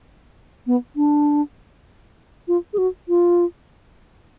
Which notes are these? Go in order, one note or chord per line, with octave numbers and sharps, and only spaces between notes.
B3
D4
F4
G#4
F#4
F4